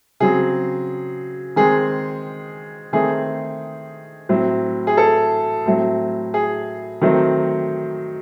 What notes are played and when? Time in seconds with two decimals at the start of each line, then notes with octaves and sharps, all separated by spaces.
0.20 C#3 F#3 C4 G#4
1.56 D#3 G#3 C4 G#4
2.93 D#3 A3 C4 G#4
4.29 A2 F#3 C4
4.87 G#4
4.97 A4
5.66 A2 F#3 A3 C4
6.34 G#4
7.02 D#3 F#3 A3 C4